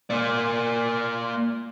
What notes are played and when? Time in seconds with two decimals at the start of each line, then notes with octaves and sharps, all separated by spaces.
0.10 A#3 D5